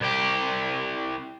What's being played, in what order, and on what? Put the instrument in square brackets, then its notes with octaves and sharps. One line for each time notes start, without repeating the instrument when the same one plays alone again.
[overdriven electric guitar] C2 G4